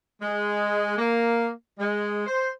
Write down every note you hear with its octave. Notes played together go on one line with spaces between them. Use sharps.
G#3
A#3
G#3
C5